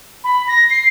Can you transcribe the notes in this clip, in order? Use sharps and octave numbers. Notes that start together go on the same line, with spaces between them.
B5
A#6
C7